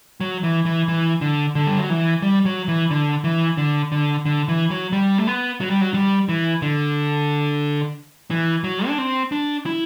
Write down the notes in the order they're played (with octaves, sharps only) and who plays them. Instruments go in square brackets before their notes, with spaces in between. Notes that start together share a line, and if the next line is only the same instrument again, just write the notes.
[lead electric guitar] F#3
E3
E3
E3
D3
D3
G3
F#3
E3
G3
F#3
E3
D3
E3
D3
D3
D3
E3
F#3
G3
A3
B3
F#3
G3
F#3
G3
E3
D3
E3
F#3
D4
C4
D4
E4